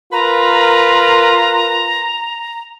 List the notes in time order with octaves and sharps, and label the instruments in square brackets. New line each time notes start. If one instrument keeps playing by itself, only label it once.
[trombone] F4 [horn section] A#4 B4 [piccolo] A#5